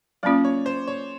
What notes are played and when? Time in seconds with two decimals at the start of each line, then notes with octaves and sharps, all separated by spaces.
0.23 F#3 A#3 C#4 F4 D5
0.45 C#5
0.66 C5
0.87 C#5